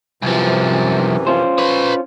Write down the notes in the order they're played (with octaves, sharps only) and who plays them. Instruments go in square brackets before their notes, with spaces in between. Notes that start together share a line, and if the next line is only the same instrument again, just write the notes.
[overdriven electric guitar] C2 F3 [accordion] F#2 C3 E3
[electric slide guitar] C#4 F4 C5
[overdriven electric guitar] B4 C#5